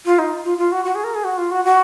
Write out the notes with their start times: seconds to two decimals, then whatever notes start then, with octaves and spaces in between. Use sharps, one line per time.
0.05 F4
0.19 D#4
0.44 F4
0.58 F4
0.72 F#4
0.85 F#4
0.95 G#4
1.04 A#4
1.14 G#4
1.24 F#4
1.37 F4
1.51 F#4
1.65 F#4